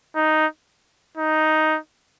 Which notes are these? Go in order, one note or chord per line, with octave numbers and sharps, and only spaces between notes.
D#4
D#4